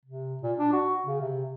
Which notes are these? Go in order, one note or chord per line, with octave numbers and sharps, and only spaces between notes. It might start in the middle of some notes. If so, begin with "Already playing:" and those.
C3
A#2
D4
F#4
C#3
C3